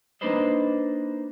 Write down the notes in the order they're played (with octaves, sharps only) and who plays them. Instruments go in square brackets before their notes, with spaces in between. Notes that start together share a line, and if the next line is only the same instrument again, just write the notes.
[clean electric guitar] A#3 D4 D#4 B4 C5 D#5